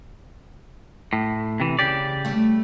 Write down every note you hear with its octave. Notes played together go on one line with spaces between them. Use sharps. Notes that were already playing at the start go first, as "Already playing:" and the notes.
A2
C3 E3
C#3 G4 D5
G3 A3